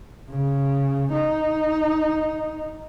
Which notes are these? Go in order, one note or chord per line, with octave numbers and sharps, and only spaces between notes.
C#3
D#4